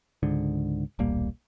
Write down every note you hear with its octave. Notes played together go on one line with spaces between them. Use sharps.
C#2 G#2 D3
D#1 B1 G3 A#3